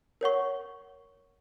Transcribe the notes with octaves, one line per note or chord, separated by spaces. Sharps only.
A#4 C#5 F#5 C#6